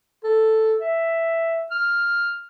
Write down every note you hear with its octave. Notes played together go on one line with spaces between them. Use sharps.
A4
E5
F6